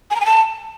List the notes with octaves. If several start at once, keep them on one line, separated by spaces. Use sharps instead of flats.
G#5
A#5
G#5
A5